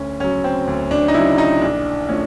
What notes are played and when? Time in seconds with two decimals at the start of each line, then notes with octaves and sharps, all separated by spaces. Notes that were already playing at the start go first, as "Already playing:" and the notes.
Already playing: D2 C#4
0.20 C#3 F#3 C#4
0.44 C4
0.67 D2
0.91 D4
1.08 D#4
1.14 C#3 F#3 E4
1.38 D#4
1.61 A#1 D4
2.09 A2 F3 A3 C#4